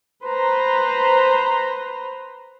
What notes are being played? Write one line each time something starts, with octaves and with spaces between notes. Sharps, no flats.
B4 C5 A#5